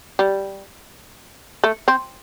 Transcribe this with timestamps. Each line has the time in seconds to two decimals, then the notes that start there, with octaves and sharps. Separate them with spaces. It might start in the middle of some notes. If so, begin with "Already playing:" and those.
0.19 G3
1.64 A3
1.88 C4